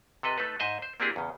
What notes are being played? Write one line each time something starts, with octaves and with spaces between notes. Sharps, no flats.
C3 A4 B4 D#5
A3 D#4 A4 B4
G#2 C5 D#5 E5
C5
A#3 C4 D4 E4 G4 G#4
E2 C#3